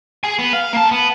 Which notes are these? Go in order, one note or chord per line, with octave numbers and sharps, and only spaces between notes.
G#4 G#5
B3
F5
A#3 A5
B3